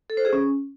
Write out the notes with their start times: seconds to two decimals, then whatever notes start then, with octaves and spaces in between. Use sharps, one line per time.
0.10 A4
0.17 C5
0.25 G#4
0.33 C#4